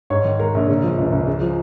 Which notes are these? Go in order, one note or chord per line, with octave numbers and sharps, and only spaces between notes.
G#2 C#5
D#3
G#3 A#4
A#1
C#3
F3
C#2
C#2
C#3
F3